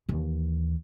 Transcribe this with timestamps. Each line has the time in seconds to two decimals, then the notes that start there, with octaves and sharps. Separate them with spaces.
0.09 D#2 E3